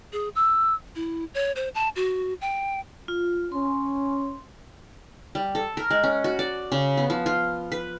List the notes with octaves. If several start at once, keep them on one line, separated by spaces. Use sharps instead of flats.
G#4
E6
E4
C#5
C5
A5
F#4
G5
F4
C#4 C6
G3
A4
A#4
G#3
C#4
F#4
D5
C#3
B3
F3
F4
B4